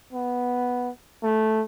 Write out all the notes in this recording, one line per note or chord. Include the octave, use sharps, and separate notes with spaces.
B3
A3